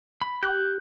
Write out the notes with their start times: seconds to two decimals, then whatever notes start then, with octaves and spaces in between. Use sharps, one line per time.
0.22 B5
0.43 G4 F#6 G6